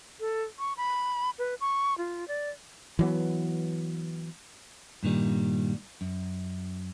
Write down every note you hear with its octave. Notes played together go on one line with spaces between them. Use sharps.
A4
C#6
B5
B4
C#6
F4
D5
E3 F#3 B3
G2 A#2 D#3 G3
F#2